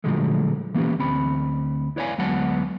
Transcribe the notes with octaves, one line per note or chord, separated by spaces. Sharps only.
A#2 D3 F3 F#3 G#3 A3
E3 A#3 B3 C#4 G4
D2 C4 B5
E4 B4 C#5 D5 F5 G#5
D2 F#3 G#3 B3 F#5 A5